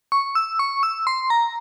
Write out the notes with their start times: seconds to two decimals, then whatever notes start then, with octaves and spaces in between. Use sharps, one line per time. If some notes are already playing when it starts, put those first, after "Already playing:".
0.12 C#6
0.35 E6
0.59 C#6
0.83 E6
1.07 C6
1.30 A#5